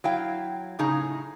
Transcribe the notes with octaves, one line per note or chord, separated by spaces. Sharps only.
F#3 E4 F5 G5
A2 C#3 D#4 G#4 A#5